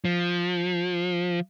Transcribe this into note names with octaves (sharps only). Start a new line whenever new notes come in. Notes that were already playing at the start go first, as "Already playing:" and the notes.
F3